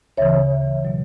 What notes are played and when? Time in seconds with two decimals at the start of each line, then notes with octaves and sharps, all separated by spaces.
0.17 D2 C#3 E3 C#5 E5
0.85 B2 F#3